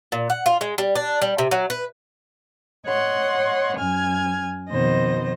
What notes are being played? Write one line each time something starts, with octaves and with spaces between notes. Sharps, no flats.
A#2
F#5
F4
G#3
G3
D4
G3
C3
F#3
B4
C#5 D#5 F#5 C6
F#2 G#5 F6 G#6
F2 B2 D#3 C5 D#5 A#6